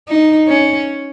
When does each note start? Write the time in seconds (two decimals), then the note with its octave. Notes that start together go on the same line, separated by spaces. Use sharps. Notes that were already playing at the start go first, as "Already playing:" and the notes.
0.08 D#4
0.48 C#4